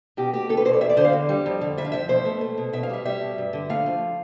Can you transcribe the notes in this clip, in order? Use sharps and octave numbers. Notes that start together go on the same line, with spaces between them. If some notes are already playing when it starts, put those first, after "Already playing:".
B2 G4
A3 G4
A3 A4
B4
B2 C5
D5
E2 E5
D5
D3 C5
F5
E2
G3
F2
D3
F2 E5
F5
F3 E5
B2 C5
A3
A3
B2
B2 E5
F5
G3 E5
G3 E5
B2
G2
D3
A3 F5
F3